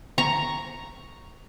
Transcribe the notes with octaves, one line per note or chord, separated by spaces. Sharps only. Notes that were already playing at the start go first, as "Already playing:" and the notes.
A#5 C#6